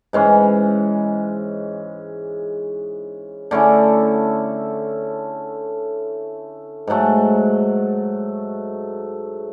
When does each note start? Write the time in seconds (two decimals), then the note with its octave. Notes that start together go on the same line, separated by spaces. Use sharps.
0.13 G#2 E3 G#3 C#4
3.51 D3 A3 C#4 E4
6.87 G#2 F#3 A3